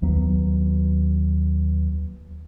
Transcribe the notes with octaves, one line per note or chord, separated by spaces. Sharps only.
D#2 F#3 B3